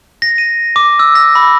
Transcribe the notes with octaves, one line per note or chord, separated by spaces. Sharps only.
A#6
D#7
D6
E6
A#6
B5